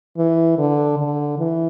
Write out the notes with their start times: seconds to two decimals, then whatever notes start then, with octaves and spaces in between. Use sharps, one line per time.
0.18 E3
0.58 D3
0.98 D3
1.39 E3